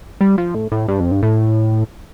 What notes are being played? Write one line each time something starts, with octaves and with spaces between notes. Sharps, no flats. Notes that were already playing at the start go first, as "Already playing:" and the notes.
G3
F3
A2
A2
G2
F2
G2
A2